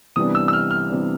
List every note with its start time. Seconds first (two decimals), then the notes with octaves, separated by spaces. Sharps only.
0.16 C3 E3 G3 B3 D4 D#6
0.35 E6
0.48 E6
0.53 F6
0.71 F6
0.89 C3 E3 G3 B3 D4